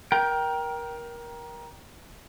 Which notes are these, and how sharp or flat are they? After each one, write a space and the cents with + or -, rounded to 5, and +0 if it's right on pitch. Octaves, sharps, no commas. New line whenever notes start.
A#4 +20 G5 -5